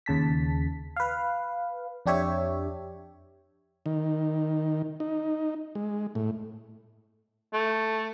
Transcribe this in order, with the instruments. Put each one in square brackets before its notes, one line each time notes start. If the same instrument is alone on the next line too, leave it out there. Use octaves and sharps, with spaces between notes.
[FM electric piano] D#2 C#3 A5 B6
B4 F5
F2 D4 G4 C#5 E5
[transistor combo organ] D#3
D#4
G#3
A2
[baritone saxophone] A3